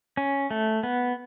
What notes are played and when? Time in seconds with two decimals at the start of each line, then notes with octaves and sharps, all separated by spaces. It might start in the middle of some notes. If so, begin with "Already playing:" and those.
0.17 C#4
0.51 A3
0.83 B3